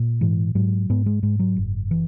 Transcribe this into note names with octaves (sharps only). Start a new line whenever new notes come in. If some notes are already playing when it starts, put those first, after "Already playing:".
Already playing: A#2
G#2 E3
G#2 F#3
G#2 B3
G#3
G#2 G#3
F#3
F#1
E3